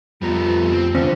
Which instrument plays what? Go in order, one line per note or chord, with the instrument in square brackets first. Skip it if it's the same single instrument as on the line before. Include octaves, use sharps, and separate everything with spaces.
[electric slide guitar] F2 B3 A#5 [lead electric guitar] G3 A3 [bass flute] F4
[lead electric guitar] C4
[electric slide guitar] E2 [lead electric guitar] D3 [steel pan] C4